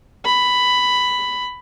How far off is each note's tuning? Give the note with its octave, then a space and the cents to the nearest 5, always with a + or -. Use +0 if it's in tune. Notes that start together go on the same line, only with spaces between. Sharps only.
B5 +10